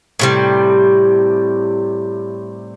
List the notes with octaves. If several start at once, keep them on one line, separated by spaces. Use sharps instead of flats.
A2 C3 G3